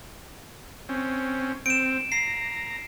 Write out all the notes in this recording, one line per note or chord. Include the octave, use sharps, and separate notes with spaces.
C4 C#4
C4 D7 E7
A#5 C7